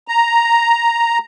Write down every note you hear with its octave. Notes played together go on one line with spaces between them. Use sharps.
A#5